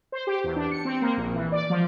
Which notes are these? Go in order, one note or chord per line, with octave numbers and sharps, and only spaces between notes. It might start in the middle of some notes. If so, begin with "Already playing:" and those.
C5
G4
E2
D4
C#7
C4
A#3
A#1
E3
D5
F3